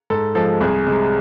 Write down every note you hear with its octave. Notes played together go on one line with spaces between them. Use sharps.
G#2 A4
F3 G#3 A4
C2 G#4
C3 G#3